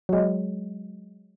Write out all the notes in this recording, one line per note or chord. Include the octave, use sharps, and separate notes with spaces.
F#3 G#3